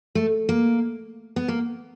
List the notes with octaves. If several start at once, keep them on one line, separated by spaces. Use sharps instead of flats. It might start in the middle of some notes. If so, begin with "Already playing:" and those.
A3
A#3
B3
A#3